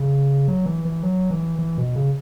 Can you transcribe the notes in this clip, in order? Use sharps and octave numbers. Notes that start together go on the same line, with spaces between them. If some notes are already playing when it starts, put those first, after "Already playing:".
Already playing: C#3
F#3
E3
E3
F#3
E3
E3
B2
C#3